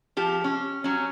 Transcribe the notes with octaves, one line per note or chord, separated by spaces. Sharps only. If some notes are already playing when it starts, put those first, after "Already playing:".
F3 G4
C#4
F#3 C#4